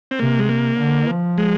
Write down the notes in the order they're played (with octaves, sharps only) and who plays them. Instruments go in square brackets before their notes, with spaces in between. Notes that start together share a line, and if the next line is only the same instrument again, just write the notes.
[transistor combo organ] C4
[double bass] C3 [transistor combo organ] A#3
[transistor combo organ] G#3
A#3
[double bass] D3
F3
[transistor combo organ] G#3